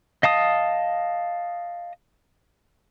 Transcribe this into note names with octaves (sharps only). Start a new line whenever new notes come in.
D#5 F5 A5 D#6